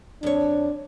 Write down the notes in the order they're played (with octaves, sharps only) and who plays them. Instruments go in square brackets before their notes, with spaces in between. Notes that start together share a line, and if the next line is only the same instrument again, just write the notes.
[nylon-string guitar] F2 C#5 [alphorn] D4